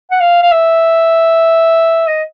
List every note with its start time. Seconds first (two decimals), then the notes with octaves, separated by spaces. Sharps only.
0.11 F#5
0.20 F5
0.42 F5
0.52 E5
2.07 D#5